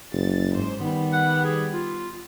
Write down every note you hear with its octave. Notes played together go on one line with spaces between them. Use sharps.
F#1 A6
G#2 C5
D#3 G3 B3
F#5
G#4
F4